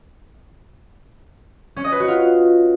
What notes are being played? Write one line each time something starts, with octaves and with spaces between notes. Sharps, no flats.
C#4
D#5
B4
F#4
F4